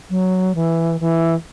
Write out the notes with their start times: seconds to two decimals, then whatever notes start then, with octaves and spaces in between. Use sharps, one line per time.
0.10 F#3
0.55 E3
1.00 E3